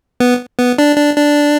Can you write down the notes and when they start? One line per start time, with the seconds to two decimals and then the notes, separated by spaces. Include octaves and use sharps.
0.20 B3
0.58 B3
0.78 D4
0.97 D4
1.16 D4